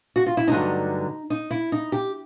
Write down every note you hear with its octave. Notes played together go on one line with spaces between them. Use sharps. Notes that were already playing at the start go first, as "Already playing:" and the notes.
F#4
F4
E4
G2 D3 F#3 A3 D#4
D#4
E4
D#4
G4